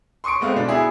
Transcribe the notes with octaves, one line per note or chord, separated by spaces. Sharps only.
C6 C#6 D#6 C#7 D7
G#3 A3 B3 C4 F5
B2 D4
B3 E4 G#4